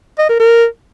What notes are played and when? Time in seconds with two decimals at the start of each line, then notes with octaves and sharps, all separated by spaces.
0.19 D#5
0.29 A#4
0.40 A#4